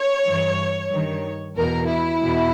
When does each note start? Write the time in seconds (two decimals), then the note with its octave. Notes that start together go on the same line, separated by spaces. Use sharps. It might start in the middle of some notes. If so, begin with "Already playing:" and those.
Already playing: C#5
0.26 G2 E3
0.91 G2 D#3
1.56 E2 B2 A#4
1.89 E4
2.23 E2 B2